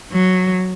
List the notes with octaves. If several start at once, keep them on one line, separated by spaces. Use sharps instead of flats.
F#3